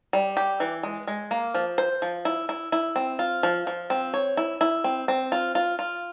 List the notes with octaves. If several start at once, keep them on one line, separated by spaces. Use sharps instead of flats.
G3
G4
E3
G#3
G#3
A#3
F3
C5
F3
E4
E4
E4
C4
F4
F3
F3
C4
C#5
E4
E4
C4
C4
F4
F4
F4